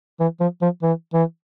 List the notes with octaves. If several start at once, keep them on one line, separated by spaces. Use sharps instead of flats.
E3
F3
F3
E3
E3